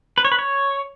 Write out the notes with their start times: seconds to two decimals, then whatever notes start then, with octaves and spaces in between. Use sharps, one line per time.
0.18 B4
0.25 C#5
0.32 B4
0.39 C#5